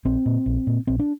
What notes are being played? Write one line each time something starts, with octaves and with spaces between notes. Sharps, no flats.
A#1 C4
A#2
A#1
A#2
A#1 C4
D4